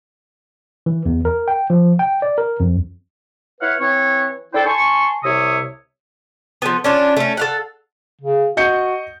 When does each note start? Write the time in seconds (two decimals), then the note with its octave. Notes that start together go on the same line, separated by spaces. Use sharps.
0.86 E3
1.06 E2
1.25 A#4
1.48 G5
1.70 F3
1.99 G5
2.22 D5
2.38 A#4
2.60 F2
3.60 E4 B4 C#5 F5 F#5
3.80 E3 C4 B4 C#5
4.53 D4 E4 A4 C5 G5
4.66 G#5 A5 C6 C#6
5.24 C2 C3 C#5 E5 D#6
6.62 F3 A3 B3
6.84 C#4 D4 F4
7.17 A3 C#4
7.37 A4 F5 F#5
8.21 C#3
8.57 F#4 D#5 G6 C#7